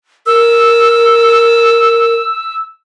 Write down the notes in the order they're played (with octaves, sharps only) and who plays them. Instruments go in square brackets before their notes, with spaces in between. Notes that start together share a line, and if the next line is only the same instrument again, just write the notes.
[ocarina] A#4 [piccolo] E6